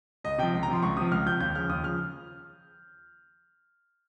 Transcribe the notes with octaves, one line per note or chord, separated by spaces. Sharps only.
C#2 D#5
C3 F3 G5
C#2
A#5
C3 F3 C6
C#2 C#6
C3 F3 D#6
C#2 F6
C3 F3 G6
D#2 G6
C#3 F3 F6
D#2 D#6
C#3 F3 F6